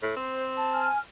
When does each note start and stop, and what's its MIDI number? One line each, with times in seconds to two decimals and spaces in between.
0.02 0.13 45
0.16 0.88 60
0.16 0.43 72
0.57 0.89 81
0.73 0.99 80
0.73 0.99 89